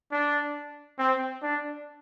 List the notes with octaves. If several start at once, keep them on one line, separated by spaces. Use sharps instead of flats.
D4
C4
D4